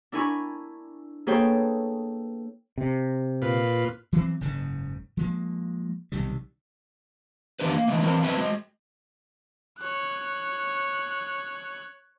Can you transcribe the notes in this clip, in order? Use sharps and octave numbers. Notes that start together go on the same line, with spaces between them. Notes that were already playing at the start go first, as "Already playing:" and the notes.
D4 E4 A#4 G#5 B5 C#6
A#3 G#4 A4 B4 C#5 G5
C3
A#2 F4 B4
E3 F#3 C4
F#1 G#2 C#3
F3 G#3 A#3
B1 C3 D#3 G3
E2 G#2 D#3 D4 G4 B4
A#3
D3 E3 G#3 A3
E3 F#3 C4 A#4
F#3 C4 B4 E5
G#3 F#4
C#5 F#6